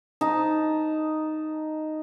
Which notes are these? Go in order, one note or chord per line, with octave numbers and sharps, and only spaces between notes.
D#4 A5